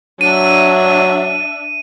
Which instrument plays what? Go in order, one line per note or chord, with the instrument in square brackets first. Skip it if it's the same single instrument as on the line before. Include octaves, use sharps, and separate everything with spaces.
[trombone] F#3 [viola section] D4 E5 [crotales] D#7